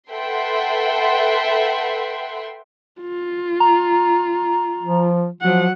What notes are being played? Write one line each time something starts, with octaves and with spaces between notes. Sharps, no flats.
A4 B4 E5 F#5 G5 C6
F4
A#5
F3
F3 F#3 F#5